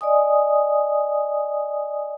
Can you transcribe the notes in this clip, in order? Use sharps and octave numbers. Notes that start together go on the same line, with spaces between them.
D5 D#5 G#5 D#6